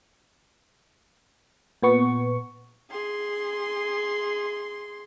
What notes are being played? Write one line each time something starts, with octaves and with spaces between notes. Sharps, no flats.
A#2 B3 C#6
G#4 C6